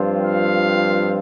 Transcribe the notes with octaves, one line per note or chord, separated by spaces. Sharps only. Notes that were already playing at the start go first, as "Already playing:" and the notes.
Already playing: G2 F3 C4 F4
F5